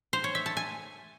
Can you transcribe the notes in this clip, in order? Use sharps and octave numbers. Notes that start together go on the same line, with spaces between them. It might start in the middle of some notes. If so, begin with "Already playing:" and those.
C5
C#5
E5
A5
G#5